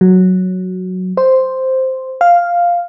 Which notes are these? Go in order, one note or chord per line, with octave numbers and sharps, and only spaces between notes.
F#3
C5
F5